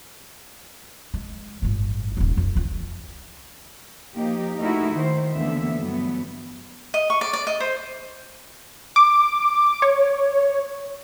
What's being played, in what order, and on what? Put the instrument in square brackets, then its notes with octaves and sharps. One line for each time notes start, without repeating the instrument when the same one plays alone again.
[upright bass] G#3
G1 A2
D#1 D#4
F2
D2 F4
[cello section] F3 A#3 D#4 G4
A3 D#4 E4 F#4 A#4
D#3 C5
D2 D3 E3 A#3 B3 E5
G2 E3 F#3 B3
[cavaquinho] D#5
C#6
D5
D5
D#5
C5
[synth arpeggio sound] D6
C#5